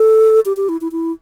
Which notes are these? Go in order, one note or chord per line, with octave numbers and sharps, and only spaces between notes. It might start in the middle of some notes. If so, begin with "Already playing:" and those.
Already playing: A4
G4
G4
E4
E4
E4